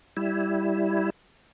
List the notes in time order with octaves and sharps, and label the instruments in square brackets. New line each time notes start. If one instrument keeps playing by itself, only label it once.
[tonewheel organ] G3 E4